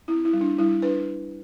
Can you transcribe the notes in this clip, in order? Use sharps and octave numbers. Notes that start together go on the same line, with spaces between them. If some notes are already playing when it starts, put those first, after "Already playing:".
C4 E4
E4
G3
D4
G3 E4
D4 B4